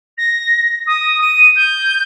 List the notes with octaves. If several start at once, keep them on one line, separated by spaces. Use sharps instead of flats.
A#6
D#6
D#7
G6